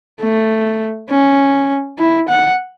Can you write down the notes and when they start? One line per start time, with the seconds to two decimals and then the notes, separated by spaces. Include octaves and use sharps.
0.20 A3
1.09 C#4
1.98 E4
2.29 F#5